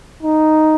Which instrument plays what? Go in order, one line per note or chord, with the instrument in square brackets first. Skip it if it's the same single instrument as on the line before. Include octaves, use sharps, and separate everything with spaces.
[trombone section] D#4